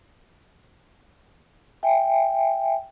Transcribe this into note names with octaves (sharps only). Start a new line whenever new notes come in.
E5 G5 G#5